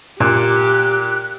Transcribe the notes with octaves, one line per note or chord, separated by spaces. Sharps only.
A#2 G4 F#6